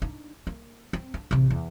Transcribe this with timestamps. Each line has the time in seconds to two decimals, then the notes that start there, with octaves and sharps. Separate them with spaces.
0.02 D4 D#4
0.47 A#3
0.93 C4
1.14 D4
1.31 A1 C3
1.50 E2